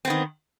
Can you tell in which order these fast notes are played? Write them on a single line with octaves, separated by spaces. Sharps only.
C4 B3 D#3